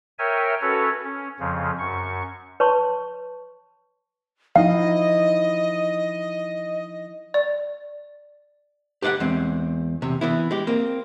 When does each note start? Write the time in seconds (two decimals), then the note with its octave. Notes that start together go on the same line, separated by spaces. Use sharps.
0.19 A#4 C#5 E5 G5 G#5
0.62 C#4 F#4 A4 B4 C#5
1.05 C#4
1.40 F2 C#3 F3
1.79 F#2 C#6
2.60 B4 C#5 A5 C6 C#6
4.56 F3 D#4 E4 D#5 F5
7.34 D5
9.02 G4 B4 D5 F5 F#5
9.20 E2 G#3 C4
10.02 E2 C3
10.21 E3 B3 E4
10.51 G#3 G4
10.67 A#3 C4